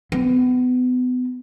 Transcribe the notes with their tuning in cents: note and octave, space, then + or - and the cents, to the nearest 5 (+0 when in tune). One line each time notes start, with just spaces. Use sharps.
B3 +30